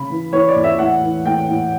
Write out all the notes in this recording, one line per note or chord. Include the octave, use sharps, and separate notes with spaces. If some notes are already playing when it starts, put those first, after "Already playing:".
Already playing: C#3 B5
E3
E3 C#5
D5
E2
E5
A2 F#5
E3
A2 G5
A2